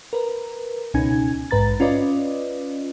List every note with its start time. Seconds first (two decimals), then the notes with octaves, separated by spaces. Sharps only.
0.13 A#4 B4
0.94 C#2 B2 C#4 D#4 G#5 G#6
1.51 A#1 G#2 B4 A#5 A6
1.80 C#4 F4 B4 D5 D#5